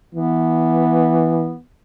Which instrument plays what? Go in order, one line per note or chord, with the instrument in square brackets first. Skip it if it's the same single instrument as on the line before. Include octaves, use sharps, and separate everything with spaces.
[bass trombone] E3 [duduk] B3